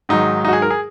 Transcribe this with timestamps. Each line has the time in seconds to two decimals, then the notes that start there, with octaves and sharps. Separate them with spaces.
0.09 G#2 D#3 F#3 D#4
0.45 D#4
0.48 F#4
0.53 G#4
0.62 A#4
0.70 G#4